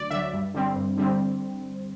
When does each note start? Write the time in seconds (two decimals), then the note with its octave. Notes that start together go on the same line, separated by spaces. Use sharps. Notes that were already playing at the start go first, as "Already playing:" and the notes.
Already playing: D2 D3 F#3 D5
0.10 D3 F#3 E5
0.33 G2
0.54 D3 G3 C4
0.75 G2
0.97 D3 G3 C4